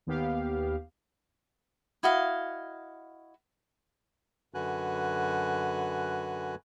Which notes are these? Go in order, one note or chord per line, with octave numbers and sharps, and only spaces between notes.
D#2 B3 G4 F5
E4 F#4 D#5 F5
F#2 D3 F#4 B4 G#5 F#6